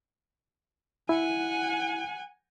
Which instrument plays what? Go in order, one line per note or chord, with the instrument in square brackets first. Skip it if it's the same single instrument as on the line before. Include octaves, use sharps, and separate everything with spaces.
[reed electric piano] E4 [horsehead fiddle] F#5 G#5